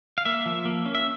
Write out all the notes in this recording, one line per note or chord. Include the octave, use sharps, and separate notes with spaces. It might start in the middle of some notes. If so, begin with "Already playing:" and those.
F5
A#3 E5
F3
A#3
C#4
E5